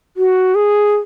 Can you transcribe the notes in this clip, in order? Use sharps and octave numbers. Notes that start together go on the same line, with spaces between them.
F#4
G#4